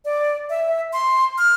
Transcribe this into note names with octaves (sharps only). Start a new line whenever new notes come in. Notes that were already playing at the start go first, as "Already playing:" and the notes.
D5
E5
C6
F6